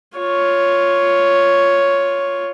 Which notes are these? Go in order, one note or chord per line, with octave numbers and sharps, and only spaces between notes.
F4 C#5